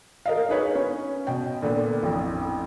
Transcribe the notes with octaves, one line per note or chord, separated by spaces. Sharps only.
A#4 D#5 F5
D#4 G#4 B4 C#5
C#4
B2 G5
A#2 D3 A#3 B3
A1 F2